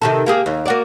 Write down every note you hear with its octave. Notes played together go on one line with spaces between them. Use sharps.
C3 D#3 A4
A#3 G4 G#4
D#2
A#3 F#4 D5